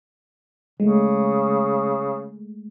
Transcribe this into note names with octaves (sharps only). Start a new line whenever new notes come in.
C#3 G#3 A3